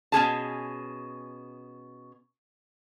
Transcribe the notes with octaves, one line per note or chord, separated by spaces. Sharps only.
B2 C#4 G#4 A5